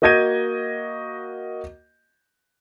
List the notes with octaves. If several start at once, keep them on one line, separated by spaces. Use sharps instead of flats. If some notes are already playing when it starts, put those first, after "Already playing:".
A#3 F#4 D#5 G6 G#6 D#7